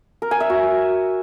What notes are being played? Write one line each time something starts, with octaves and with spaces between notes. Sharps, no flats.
A#4
G#5
E5
F#4